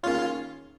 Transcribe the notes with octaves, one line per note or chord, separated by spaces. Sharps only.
D#3 A#3 C#4 F4 G#4 C#5